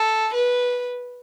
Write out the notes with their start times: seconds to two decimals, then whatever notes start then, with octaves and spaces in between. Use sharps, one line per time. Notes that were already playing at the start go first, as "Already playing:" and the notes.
Already playing: A4
0.34 B4